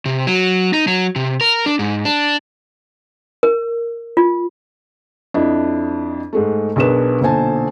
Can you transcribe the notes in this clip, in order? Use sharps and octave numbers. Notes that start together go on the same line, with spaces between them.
C3
F#3
D#4
F#3
C3
A#4
D4
G#2
D4
A#4
F4
F2 D4 E4 D#5
G#2 G#3 A3
B1 D4 G#4 A#4 B4 E7
B1 A#2 D3 C5 G#5 A5